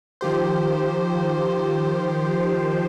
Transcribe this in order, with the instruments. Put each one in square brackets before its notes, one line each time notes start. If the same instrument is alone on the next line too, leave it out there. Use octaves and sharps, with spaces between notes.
[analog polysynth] D#3 F3 G4 C5